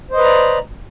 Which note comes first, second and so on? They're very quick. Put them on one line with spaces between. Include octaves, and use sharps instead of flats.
C5 D#5 B4 A#5 D5